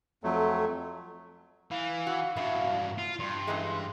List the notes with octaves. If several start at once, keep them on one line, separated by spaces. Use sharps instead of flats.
F2 F#3 A3
E3 F5
F#4
G2 F#3 E4
F4
G2 C6
F#2 E3 G#3